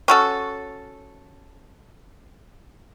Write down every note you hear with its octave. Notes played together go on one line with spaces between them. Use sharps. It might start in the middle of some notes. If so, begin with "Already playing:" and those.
C#4 F#4 A4